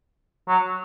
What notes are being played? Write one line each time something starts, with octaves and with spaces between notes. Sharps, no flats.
F#3